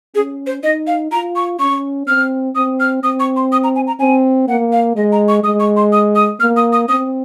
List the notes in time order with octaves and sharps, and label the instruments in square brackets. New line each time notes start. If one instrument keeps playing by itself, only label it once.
[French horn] C#4 [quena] G#4
[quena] C5
[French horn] D#4 [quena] D#5
[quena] F5
[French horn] F4 [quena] A#5
[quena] C#6
[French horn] C#4 [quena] C#6
[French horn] C4 [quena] F6
[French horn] C4 [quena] D#6
[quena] F6
[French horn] C4 [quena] D#6
[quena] C#6
C6
D#6
A#5
G#5
A#5
[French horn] C4 [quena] G#5
[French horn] A#3 [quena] F#5
[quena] F5
[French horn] G#3 [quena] D#5
[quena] A#5
C#6
[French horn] G#3 [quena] D#6
[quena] C#6
C6
D#6
D#6
[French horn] A#3 [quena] F6
[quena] D#6
D#6
[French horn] C4 [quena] D#6